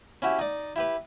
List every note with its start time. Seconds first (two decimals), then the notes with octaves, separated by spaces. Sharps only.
0.22 C#4 E4 F#4 G4
0.39 D#4 D5
0.76 E4 G4 B4